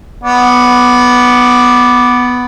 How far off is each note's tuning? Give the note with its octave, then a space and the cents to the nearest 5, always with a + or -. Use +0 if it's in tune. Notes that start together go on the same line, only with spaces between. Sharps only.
B3 +0 D5 +0